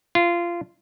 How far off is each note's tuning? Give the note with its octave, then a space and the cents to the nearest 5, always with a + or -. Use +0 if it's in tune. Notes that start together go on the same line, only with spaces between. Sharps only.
F4 -20